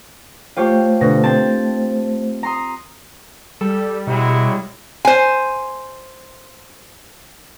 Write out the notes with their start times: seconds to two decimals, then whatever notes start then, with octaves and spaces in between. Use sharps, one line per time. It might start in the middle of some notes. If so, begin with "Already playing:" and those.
0.57 A3 F4 G4 C5 C#5
1.01 B2 D3 A#6
1.24 C4 A5
2.43 A#5 C6 D#6
3.61 G3 A4
4.07 B2 F#3 G#3 E4
5.05 C5 G#5